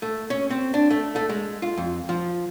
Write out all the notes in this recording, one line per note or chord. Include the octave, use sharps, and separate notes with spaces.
A3
C#4
C4
D4
A3
A3
G#3
F4
F2
F3